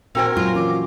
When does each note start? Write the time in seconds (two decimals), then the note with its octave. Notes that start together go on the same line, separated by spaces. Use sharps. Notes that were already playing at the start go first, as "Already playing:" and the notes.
0.15 A#2 C4 F#4 A#4 C5 G5 G#5
0.37 F#3 F4
0.55 E3 C#4 F#4 D6